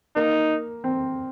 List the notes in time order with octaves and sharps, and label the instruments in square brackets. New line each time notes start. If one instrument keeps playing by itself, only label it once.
[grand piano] A#3 [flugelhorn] D#4
[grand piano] C4